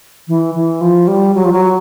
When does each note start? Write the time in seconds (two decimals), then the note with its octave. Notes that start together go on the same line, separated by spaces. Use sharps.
0.28 E3
0.55 E3
0.81 F3
1.08 G3
1.35 F#3
1.45 F3
1.53 F#3